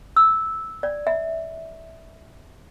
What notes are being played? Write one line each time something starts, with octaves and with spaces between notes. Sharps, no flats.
E6
D5
E5